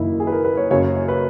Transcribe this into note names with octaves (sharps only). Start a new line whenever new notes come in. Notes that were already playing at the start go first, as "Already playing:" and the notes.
Already playing: F#1 F#2 D#3 A#3 D#4 E4
G#4
B4
A#4
B4
C#5
F#1 F#2 C#3 C#5
C#5
B4